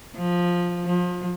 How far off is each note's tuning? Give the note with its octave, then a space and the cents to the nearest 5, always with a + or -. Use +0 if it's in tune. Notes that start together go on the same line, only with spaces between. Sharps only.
F3 +10
F3 +30